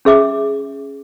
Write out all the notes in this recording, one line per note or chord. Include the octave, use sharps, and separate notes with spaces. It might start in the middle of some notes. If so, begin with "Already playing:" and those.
C#4 G#4 E5 D6